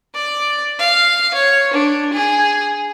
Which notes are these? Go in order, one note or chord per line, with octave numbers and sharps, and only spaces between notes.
D5
F5
C#5
D4
G#4